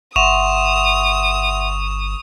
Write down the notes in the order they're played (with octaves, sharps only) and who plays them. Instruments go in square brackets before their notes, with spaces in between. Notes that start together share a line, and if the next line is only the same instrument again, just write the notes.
[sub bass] G1 [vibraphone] E5 F#5 C6 [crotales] C#6 E7 F7 [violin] D#6